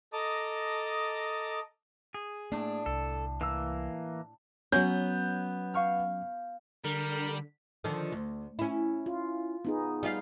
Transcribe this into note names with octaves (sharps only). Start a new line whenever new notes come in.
A4 D#5 A5 A#5 D6 D#6
G#4
A2 A3 A#3 D4
C2 A4
E3 A#3 E6
F#3 B3 C#4 G6
F5 C#6 F6
D3 G3 A#4
D3 D#3 F3
D2
C#4 E4
F4
B3 D#4 G#4
G3 F4 F5